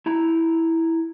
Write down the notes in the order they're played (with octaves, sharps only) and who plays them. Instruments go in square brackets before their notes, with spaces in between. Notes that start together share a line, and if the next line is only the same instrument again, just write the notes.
[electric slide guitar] E4 A#5